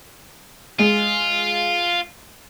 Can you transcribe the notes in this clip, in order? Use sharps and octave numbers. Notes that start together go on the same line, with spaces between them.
G#3 F4